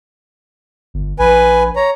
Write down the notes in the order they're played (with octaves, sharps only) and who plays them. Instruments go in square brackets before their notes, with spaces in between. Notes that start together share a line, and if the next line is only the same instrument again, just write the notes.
[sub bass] G1
[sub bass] A#1 [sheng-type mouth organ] B4 G#5
[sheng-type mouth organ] C#5 A#5